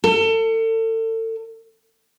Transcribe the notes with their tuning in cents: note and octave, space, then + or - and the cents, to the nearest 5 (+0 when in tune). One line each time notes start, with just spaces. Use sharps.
A4 +35